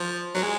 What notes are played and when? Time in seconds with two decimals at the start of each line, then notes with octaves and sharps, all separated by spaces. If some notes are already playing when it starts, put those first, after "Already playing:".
Already playing: F3
0.35 F#3
0.43 G#3